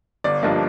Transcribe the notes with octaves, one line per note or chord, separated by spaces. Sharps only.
G1 D5
G2 F3 A#3 D4 D#5